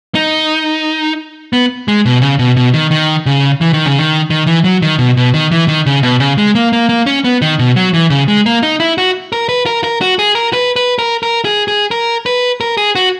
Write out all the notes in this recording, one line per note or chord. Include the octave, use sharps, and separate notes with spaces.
D#4
B3
G#3
B2
C#3
B2
B2
D#3
D#3
C#3
E3
D#3
C#3
D#3
D#3
E3
F#3
D#3
B2
B2
D#3
E3
D#3
C#3
B2
C#3
G#3
A#3
A#3
A#3
C#4
B3
D#3
B2
F#3
E3
C#3
G#3
A#3
D#4
E4
F#4
A#4
B4
A#4
A#4
F#4
G#4
A#4
B4
B4
A#4
A#4
G#4
G#4
A#4
B4
A#4
G#4
F#4